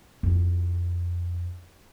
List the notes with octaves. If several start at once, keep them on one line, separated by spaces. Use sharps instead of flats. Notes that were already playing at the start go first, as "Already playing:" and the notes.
F2 E4